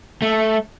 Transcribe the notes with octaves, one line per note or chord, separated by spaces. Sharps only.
A3